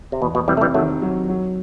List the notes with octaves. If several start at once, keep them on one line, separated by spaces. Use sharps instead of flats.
C3
E2 B2
B2
C3 E3 G3
A3
E3 G3
D#3 F#3 A3
F#3
F#3